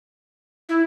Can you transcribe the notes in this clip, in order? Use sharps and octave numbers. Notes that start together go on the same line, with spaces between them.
E4